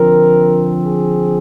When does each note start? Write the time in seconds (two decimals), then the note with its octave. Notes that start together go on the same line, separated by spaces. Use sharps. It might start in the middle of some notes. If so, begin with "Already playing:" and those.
Already playing: D3 F3 C4 A#4
0.84 G#4